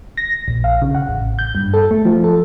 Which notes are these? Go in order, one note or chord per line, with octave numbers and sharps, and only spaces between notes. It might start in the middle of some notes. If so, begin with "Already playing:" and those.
A#6
A#1
F5
C#3
F#5
A1
G6
G2
A4
A3
F3
A4